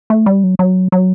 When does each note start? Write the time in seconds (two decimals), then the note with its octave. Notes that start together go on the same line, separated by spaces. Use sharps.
0.10 A3
0.26 G3
0.44 F#3
0.59 F#3
0.92 F#3